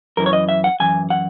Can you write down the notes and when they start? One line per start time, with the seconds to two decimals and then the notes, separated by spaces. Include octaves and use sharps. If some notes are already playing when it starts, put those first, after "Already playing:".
0.17 F#2 E3 A#4
0.26 C#5
0.33 D#5
0.49 E5
0.64 F#5
0.80 F#2 E3 G#5
1.10 F#5